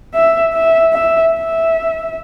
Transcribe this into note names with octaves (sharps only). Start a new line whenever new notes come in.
E5
E5
E5
E5